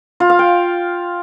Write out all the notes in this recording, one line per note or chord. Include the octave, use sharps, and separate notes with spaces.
F4
F5
G5